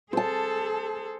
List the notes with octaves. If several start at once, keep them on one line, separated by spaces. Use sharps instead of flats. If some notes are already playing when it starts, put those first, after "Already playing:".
G#4 A4 C5 A5